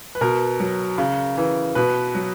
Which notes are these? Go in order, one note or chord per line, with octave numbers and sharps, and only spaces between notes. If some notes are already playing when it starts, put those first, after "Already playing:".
B4
B2 A#4
F#3
C#3
E3
B2 B4
F#3